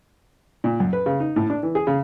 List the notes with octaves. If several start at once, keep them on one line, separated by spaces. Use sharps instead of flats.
A#2
F#2
B4
C#3
D#4
A2
D4
E3
G#4
C#3